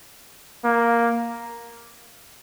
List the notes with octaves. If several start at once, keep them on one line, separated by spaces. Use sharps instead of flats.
A#3